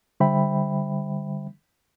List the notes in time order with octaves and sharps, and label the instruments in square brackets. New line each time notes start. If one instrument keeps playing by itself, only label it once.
[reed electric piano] D3 G3 C5 E5 G5 B5